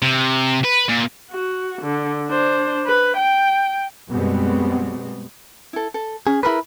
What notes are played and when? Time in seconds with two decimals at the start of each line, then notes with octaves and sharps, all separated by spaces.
0.02 C3
0.64 B4
0.89 A#2
1.31 F#4
1.82 D3
2.27 D4 C5
2.86 B4
3.17 G5
4.09 F#2 B2 G3 G#3 B3 C4
5.73 E4 A4
5.94 A4
6.27 C#4 G#4
6.43 E4 G#4 A#4 B4 B5